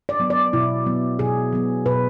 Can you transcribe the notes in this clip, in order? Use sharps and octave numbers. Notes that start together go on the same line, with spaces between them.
D5
F#3 B3
D5
B2 E4
F#3 B3
B2 G#4
F#3 B3
B2 B4